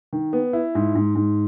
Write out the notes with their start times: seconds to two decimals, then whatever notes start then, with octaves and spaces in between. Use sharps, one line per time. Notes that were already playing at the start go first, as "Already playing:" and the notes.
0.13 D#3
0.33 B3
0.53 E4
0.75 G#2
0.95 G#2
1.15 G#2